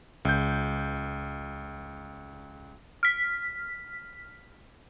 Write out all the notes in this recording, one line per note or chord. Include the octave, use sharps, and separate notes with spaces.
C#2 G6
F6 B6